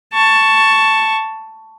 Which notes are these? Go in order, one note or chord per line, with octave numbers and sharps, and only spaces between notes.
A5 C#6